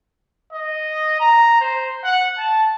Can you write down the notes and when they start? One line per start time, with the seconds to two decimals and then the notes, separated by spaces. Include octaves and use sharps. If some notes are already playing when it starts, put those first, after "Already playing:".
0.53 D#5
1.20 A#5
1.60 C5
2.04 F#5
2.38 A5